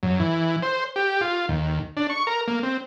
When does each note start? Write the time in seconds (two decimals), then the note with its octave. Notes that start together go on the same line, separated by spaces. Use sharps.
0.03 F#2
0.20 E3
0.63 C5
0.96 G4
1.21 F4
1.48 D#2
1.97 D4
2.10 C#6
2.27 A#4
2.48 A#3
2.63 C4